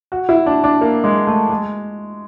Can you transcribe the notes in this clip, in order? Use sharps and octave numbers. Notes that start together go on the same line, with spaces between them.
F#4
E4
D4
D4
A#3
G#3
A3
G#3